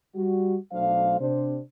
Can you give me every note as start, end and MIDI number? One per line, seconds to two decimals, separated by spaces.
0.16 0.57 55
0.16 0.57 66
0.73 1.18 35
0.73 1.18 54
0.73 1.18 57
0.73 1.18 62
0.73 1.18 72
0.73 1.18 77
1.20 1.59 48
1.20 1.59 60
1.20 1.59 62
1.20 1.59 72